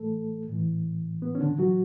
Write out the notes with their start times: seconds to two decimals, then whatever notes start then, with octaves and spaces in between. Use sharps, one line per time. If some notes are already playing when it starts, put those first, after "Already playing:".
Already playing: A2 E3 A3 A4
0.49 A2 E3
1.22 B3
1.35 C#4
1.40 D3 D4
1.58 F#3 F#4